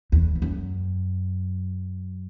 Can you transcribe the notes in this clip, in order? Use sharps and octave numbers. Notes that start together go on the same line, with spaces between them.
E2
F2
F#2